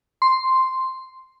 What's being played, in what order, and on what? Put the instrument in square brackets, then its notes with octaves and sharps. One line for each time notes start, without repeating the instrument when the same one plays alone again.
[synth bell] C6